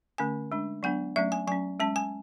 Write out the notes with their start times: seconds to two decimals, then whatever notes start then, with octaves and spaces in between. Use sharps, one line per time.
0.18 D3 A3 C#4 G#5
0.52 G#3 D4
0.83 F#3 B3 D4 F#5
1.16 F#3 A3 C#4 E5
1.32 G#5
1.47 F#3 C#4 G#5
1.80 G#3 C#4 A5
1.96 G#5